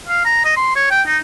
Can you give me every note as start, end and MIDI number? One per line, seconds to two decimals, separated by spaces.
0.08 0.24 77
0.25 0.41 82
0.45 0.52 75
0.57 0.72 84
0.75 0.90 73
0.91 1.02 79
1.07 1.18 63